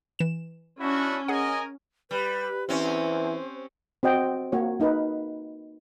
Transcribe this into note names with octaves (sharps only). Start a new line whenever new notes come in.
E3 E7
C#4 D4 E4 F#4
G#4 A#4 D#5 F#5 G#5
G3 B4
E3 C4 C#4 C5
C4 F#4 D#5 G5
A#3 F#4 C#5
A#3 D#4 A#4 B4